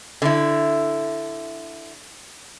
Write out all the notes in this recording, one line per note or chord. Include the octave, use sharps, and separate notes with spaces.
D3 E4